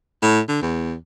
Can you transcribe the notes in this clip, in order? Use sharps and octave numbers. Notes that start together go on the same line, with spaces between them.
A2
D3
E2